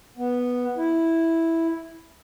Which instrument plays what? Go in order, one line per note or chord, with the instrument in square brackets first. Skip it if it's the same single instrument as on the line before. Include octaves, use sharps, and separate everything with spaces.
[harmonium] B3
E4